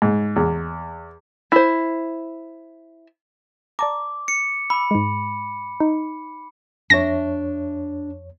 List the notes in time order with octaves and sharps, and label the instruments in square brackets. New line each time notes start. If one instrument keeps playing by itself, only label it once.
[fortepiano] G#2
E2
[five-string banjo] E4 C5
[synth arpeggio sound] D5 A5 A#5 [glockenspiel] D6
[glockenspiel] C#7
[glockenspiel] B5 [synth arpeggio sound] D6 E6
[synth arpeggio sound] G#2 G#3
D#4
[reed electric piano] F2 C#5 [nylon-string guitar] D4 E5 [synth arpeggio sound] A#6